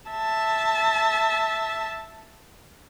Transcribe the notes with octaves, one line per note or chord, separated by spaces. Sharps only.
E5 A5